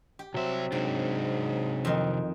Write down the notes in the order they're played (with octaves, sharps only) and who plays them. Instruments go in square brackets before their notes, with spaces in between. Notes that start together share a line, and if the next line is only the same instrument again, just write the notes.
[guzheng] G4
[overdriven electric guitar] C2 E5 [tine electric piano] F#3 C4
[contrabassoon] G#2 [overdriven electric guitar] C3 D4 [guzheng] G5
[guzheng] F2 D#3